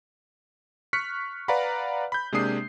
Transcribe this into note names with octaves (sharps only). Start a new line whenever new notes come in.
C#6 F6 F#6 B6 C#7
B4 D5 F5 F#5 A#5 B5
B5 G6
C3 G#3 A#3 D4 D#6 C7